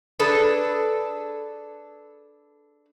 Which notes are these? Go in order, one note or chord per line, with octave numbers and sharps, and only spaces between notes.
D4 G#4 A4 B4